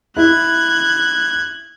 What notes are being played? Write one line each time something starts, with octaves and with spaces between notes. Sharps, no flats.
E4 F#6 G#6